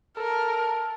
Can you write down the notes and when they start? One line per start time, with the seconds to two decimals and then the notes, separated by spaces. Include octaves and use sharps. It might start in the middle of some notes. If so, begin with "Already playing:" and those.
0.17 A4 A#4